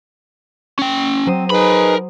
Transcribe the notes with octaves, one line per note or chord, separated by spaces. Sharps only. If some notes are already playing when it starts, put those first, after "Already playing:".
C#4 G5
F#3 C4 C5 D#6
D#4 G#4 A#4 B4 B5